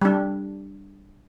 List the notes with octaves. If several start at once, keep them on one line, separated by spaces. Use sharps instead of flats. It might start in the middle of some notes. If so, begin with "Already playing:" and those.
G3 D4